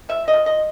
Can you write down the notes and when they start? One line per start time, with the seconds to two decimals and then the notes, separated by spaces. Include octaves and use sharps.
0.09 F3 E5
0.28 D#5
0.34 F3
0.46 D#5